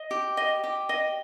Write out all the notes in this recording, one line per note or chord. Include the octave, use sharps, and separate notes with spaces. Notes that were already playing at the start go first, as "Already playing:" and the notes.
Already playing: D#5
G4
D#5
G4
D#5